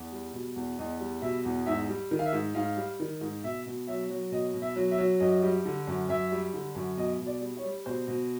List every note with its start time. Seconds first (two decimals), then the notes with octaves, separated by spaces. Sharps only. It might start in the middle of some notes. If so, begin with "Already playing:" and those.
Already playing: E2
0.12 G3
0.33 B2
0.56 E2
0.78 E2 D#5
1.00 G3
1.22 B2 E5
1.45 E2
1.66 G#2 E5
1.89 G3
2.11 D#3
2.19 F5
2.26 E5
2.33 G#2
2.55 G#2 F5
2.77 G3
3.00 D#3
3.21 G#2
3.43 B2 E5
3.66 B2
3.87 F#3 E5
4.09 F#3
4.32 B2 D#5
4.54 B2
4.62 E5
4.76 F#3
4.91 E5
4.98 F#3
5.20 F#2 D#5
5.42 G3
5.65 D3
5.87 F#2
6.09 F#2 E5
6.32 G3
6.54 D3
6.75 F#2
6.97 B2 D#5
7.19 B2
7.26 D5
7.41 G3
7.57 C#5
7.65 G3
7.86 B2 C5
8.08 B2